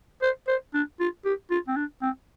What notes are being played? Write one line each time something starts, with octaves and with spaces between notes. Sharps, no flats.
C5
C5
D4
F4
G4
F4
C4
D4
C4